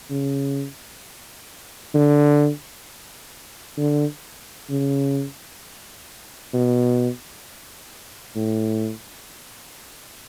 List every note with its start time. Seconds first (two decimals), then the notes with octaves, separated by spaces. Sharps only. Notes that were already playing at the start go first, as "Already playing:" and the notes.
0.10 C#3
1.94 D3
3.78 D3
4.70 C#3
6.54 B2
8.36 A2